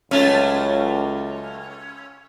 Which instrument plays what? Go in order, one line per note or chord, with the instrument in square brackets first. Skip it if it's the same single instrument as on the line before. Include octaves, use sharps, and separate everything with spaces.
[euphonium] C#2 [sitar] F#3 A3 F4 [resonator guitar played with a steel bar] C#4